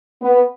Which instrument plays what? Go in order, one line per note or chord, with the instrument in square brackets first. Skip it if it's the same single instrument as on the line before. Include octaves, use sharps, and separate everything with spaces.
[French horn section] B3